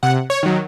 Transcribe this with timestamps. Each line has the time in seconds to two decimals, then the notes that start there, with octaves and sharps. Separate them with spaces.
0.03 C3 F#5
0.30 C#5
0.43 D#3 F#3